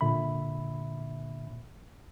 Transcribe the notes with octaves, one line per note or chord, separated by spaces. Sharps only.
A#2 D3 E5 B5